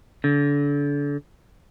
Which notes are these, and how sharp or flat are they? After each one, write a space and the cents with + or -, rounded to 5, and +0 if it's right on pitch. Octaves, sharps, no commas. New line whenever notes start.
D3 -30